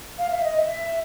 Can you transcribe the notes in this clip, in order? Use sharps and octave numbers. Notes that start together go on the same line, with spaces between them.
F5
E5
D#5
E5